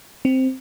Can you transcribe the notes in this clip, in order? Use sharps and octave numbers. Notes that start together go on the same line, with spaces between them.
C4